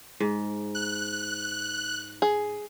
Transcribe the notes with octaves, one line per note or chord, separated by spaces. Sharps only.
G#2
F#6
G#4